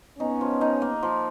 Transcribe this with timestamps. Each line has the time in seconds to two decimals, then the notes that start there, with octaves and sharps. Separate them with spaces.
0.19 B3 C#4 D#4
0.41 F3
0.61 D#4
0.82 A#3
1.03 F3